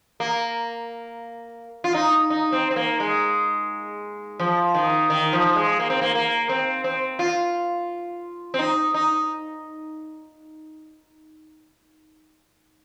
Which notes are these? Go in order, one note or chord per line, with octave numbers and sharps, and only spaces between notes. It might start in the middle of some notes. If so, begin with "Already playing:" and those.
A#3
F4
D#4
D#4
C4
C4
A#3
G#3
F3
D#3
D#3
F3
G#3
A#3
C4
A#3
A#3
C4
C4
F4
C4
D#4
D#4